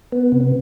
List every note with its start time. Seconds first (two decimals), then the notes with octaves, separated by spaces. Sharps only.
0.12 B3
0.32 C3